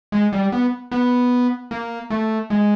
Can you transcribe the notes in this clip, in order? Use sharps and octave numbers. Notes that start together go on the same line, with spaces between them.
G#3
G3
B3
B3
A#3
A3
G#3